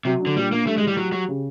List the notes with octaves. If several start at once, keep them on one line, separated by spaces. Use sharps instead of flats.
C3 F#3
D4
D3
A#2 G3
A#3 D4
G3 A3
G#3
A2
G3
F#3 G4
F#3 G4
C#3